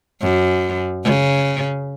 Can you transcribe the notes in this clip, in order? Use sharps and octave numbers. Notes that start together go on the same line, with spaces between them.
F#2
C#3